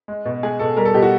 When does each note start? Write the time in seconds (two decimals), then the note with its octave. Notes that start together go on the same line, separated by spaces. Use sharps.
0.08 G#3
0.25 B2
0.43 G#3 G#4
0.59 B2 A4
0.76 G3 A#4
0.85 A4
0.94 B2 G4
1.02 F#4